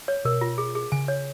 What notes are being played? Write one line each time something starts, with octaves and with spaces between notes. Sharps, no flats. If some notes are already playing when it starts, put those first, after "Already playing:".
C#5
B2 A#4
F4
G#4
G#4
C#3 G#5
C#5